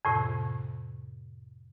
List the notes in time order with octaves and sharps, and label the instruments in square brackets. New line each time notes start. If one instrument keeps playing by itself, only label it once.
[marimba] F2 A2 C3